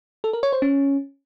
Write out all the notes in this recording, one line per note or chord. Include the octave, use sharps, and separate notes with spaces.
A4
A#4
C#5
C5
C#4